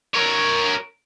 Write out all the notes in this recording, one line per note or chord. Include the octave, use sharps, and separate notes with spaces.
A#4 C#5